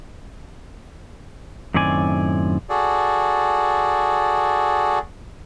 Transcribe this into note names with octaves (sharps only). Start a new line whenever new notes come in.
F#2 A2 D#3 C4 D5 G#5
F#4 G#4 A4 D5